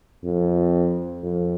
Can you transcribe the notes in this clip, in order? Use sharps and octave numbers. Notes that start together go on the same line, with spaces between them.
F2
F2